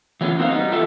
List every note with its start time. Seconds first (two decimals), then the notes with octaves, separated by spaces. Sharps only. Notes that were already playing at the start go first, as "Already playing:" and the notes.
0.21 E3 F#3 B3 C#4 F4
0.38 A#3 C4 D#4 F#4 C5 F5
0.50 G3 B3 D#4
0.71 E2 E3 F4 G4 A4 E5